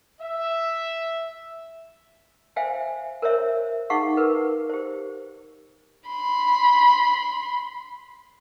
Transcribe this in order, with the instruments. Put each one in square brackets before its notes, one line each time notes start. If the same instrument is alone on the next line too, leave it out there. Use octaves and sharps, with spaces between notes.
[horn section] E5
[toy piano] C5 E5 F5 G5 G#5
A#4 C5 C#5 E5
D#4 G#4 F5 F#5 C#6
A#4 B4
G4 C5
[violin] B5 C6